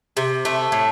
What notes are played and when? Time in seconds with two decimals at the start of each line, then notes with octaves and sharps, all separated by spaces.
0.17 C3
0.45 A3
0.72 A2